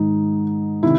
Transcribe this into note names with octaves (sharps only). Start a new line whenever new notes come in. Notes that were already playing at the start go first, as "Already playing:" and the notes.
Already playing: G#2 D#3 D#4
C3 D#3 E4